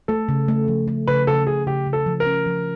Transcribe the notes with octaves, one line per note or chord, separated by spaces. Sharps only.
A3 A4
C#3
A3
F3
A3
C#3 B4
C#3 A4
C#3 G#4
C#3 G4
C#3
A4
F3
A#4
C#4
F3